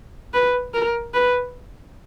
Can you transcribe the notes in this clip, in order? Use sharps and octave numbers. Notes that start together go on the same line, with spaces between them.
B4
A#4
B4